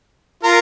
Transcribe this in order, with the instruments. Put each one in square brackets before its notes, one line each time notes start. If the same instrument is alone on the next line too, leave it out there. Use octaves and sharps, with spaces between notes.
[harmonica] F4 A#4